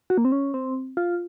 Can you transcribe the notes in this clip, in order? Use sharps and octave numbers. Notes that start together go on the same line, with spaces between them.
F#4
A#3
C4
C#4
C4
F4